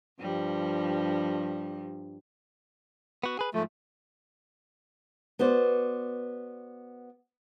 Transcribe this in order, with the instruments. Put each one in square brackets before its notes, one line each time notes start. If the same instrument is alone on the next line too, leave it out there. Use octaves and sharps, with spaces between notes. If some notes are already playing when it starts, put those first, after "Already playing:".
[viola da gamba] G2 F3 G3
[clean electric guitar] B3 F#4
G#4 B4
[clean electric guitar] G#2 F3 [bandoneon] A3
[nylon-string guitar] B3 F#4 C5 D5